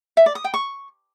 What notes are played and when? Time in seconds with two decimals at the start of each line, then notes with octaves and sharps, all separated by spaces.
0.17 E5
0.26 D5
0.35 D#6
0.44 G5
0.54 C#6